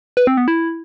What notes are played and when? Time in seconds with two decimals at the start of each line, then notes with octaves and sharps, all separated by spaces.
0.17 B4
0.27 C4
0.37 B3
0.48 E4